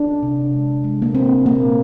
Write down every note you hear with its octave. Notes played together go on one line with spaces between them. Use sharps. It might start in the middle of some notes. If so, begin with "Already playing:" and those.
Already playing: D4
C3
G#3
G#3
A#3
G#3 C4
A#2 A#3